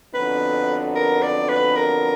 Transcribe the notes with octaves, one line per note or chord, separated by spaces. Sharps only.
F2 D3 F#3 B3 D#4 B4
A#4
D5
B4
A#4